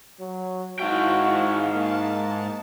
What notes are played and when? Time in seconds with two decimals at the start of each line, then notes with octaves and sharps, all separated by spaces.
0.19 F#3
0.79 G#2 E4 F#4 F5 G5
1.75 A#3 A5